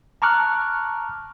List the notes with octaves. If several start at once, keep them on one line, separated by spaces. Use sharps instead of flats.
A5 A#5 C#6 D6 F6 F#6